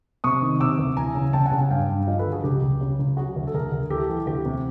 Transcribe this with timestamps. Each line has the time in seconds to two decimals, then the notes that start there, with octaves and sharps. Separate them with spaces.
0.24 C3 C#6 D#6
0.42 D#3
0.60 C3 D6 E6
0.79 D2
0.97 E3 G#5 A#5
1.15 C#3
1.33 C#3 G5 A5
1.46 F#5 G#5
1.52 C#3
1.58 F#5 G#5
1.71 G2 F5 G5
1.89 G2
2.07 F3 D#5 F5
2.19 A4 B4
2.26 D3
2.31 F#4 G#4
2.44 C#2 G4
2.62 C#2
2.81 C#3
2.99 C#2
3.17 F#3 F#4 G#4
3.36 D2
3.47 A4
3.54 D2 G#4 A#4
3.72 D2
3.90 E3 G4 A4
4.09 E3
4.27 D2 G4
4.45 C3